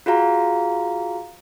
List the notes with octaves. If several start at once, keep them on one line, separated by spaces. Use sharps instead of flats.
F4 F#4 G#4 F5 A#5